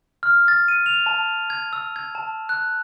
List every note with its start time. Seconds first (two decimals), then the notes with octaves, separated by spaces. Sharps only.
0.23 F6
0.48 A6
0.68 D#7
0.86 F7
1.06 A5
1.50 G#6
1.73 E6
1.96 G#6
2.15 A5
2.49 F#6